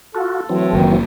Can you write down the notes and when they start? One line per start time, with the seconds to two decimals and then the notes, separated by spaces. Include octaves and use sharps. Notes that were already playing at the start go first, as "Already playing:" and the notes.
0.15 F4 F#4 A4
0.49 A2 E3 F#3 C4
0.73 F#1 A#2 D#3